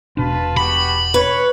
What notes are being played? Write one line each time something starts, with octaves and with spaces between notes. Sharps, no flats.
E1 B2 D4 F4 B4 A5
B3 F#4 G4 B5
B4 C#5